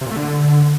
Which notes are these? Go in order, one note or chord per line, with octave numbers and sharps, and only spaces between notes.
C3
A#2
A3
D3